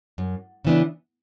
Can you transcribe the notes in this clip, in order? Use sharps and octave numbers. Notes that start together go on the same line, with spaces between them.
F#2
C#3 E3 B3 D4